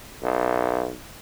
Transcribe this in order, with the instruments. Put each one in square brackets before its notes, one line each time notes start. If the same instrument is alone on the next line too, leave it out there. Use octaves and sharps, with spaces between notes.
[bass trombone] B1